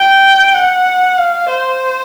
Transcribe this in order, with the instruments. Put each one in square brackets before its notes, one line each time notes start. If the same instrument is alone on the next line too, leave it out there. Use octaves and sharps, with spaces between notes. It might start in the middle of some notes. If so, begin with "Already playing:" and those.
Already playing: [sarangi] G5
F#5
F5
C5